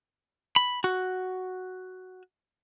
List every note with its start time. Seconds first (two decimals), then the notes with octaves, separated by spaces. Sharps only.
0.56 B5
0.84 F#4